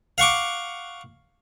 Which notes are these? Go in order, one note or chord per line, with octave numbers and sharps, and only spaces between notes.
F5 F#5 C#6 D6